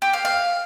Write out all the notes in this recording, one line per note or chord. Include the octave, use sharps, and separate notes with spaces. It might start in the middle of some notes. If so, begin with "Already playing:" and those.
G4
F5
F5